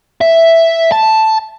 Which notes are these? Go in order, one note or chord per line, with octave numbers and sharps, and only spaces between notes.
E5
A5